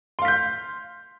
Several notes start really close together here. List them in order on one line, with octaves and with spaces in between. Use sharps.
C6 F5 B6 G6